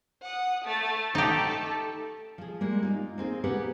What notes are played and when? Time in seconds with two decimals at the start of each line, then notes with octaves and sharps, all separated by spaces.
0.23 F#5 D#6
0.65 A3 A6
1.15 A3 D#4 G4 A4
2.38 F3 G#4
2.61 G3 G#3 A#3
2.83 D#4 F4
3.18 A#3 C4 G#4
3.44 G4 G#4 A#4 B4 F#5